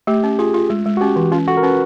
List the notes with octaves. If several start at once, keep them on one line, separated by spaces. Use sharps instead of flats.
A3 G4
C#4
F4 G#4
F4
G#3
G#3
F#4
C#4 G4
E3
C#4 F4
F#4 A4
A#4
C#4 B4